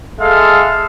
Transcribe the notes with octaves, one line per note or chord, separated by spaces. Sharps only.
G#3 A4 E5 F5